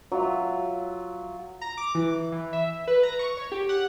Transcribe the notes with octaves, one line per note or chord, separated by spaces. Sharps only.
F#3 F4 E5
A#5
D6
E3
E3
E5
B4
A#5
C#6
C#5
G4
F#5